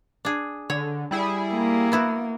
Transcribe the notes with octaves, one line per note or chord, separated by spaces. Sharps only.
D4 G#4
D3 C#5
G3 E4 G#4
A#3
B3 E4 F#4